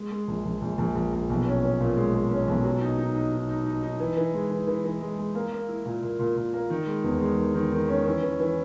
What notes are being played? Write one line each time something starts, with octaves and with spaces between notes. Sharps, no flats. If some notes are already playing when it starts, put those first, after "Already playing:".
Already playing: G#3
G#3
A#1
A#1
A#1
A#1
A#1
A#1
B1
C#4
C#4
A#2
G#3
G#3
C#4
B1
F#3
D#4
D#4
D#4
D#4
D#4
D#4
D#4
E3
E3
G#3
E3
E3
E3
G#3
G#3
A#3
A#3
E4
A#2
A#2
A#2
A#2
A#3
D#3
G#3
E2
G#3
D#3
D#3
D#3
C#4
E3
E3
E3